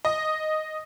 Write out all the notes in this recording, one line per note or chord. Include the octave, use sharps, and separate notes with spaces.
D#5